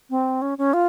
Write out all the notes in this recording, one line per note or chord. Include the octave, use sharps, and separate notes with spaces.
C4
C#4
C#4
F4